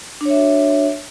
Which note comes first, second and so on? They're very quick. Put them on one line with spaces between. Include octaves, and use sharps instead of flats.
D4 C#5 E5 F#4